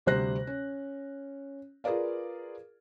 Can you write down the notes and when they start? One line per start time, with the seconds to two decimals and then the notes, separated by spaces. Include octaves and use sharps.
0.06 D2 C3 G3 C5 F#6 A#6
0.47 C#4
1.84 F4 G#4 A#4 B4 D5 F5